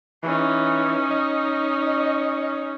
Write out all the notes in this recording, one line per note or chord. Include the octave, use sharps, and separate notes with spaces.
E3 C#4 D#4
D#5